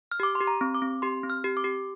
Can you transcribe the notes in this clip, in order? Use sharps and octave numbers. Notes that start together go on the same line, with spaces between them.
F6
G4 D6
C6
G4
A#5
C4
D6
C4
G4 C6
C4
F6
G4
D6
G4